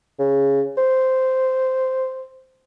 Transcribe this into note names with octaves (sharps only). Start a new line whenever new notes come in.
C#3
C5